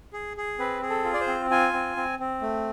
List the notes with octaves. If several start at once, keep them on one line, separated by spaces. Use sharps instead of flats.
G#4
G#4
C4 B4
G#4
A4
F4
D5
C5
C4
F4 G#5
C4
C4
C4
A3